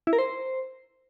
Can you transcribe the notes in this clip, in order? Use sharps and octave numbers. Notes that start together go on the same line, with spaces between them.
E4
A#4
C5